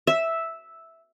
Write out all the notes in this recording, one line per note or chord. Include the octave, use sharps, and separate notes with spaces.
E5